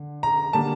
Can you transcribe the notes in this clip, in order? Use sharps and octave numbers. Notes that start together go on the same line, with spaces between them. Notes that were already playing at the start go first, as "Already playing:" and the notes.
Already playing: D3
A#5
D3 G3 A#3 A5